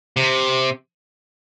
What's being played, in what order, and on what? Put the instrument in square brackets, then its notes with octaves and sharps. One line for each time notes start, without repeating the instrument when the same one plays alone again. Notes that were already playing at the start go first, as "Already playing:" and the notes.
[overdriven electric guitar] C3